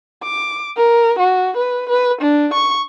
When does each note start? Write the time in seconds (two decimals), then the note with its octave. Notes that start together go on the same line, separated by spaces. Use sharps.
0.23 D6
0.77 A#4
1.19 F#4
1.57 B4
1.89 B4
2.21 D4
2.54 C#6